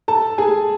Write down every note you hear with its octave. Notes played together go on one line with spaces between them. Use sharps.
A4 A5
G#4 G#5